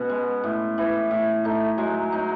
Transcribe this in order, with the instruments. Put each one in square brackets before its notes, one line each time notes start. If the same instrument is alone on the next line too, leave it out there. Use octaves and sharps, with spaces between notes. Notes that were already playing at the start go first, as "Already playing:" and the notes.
Already playing: [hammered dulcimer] B2 C#4 [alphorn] B3
[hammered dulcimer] G#3
A2
E3
A2
[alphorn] A3 [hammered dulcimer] D#4
[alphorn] F#3 [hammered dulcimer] G#3
[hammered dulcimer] D#4